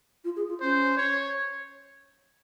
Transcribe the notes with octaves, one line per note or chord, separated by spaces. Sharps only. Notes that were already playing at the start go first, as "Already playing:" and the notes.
F4
G#4
F4
C#4 C5
C#5